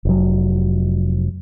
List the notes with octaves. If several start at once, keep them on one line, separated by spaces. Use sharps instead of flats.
F1 F#3